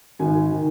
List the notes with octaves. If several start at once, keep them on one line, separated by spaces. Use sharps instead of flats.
G#1 G#5
D#3